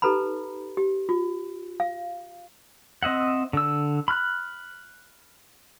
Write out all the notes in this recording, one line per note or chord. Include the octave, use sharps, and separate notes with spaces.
D#4 G4 A4 B4 A#5 B5
G4
F4
F5
C4 D#5 E5 F#5
D3 E6
B5 F6 F#6